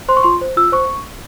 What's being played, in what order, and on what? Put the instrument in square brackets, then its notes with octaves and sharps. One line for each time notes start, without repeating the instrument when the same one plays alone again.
[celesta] C5 C6
C#6
F4 C6
C5
F4 E6
C5 C#6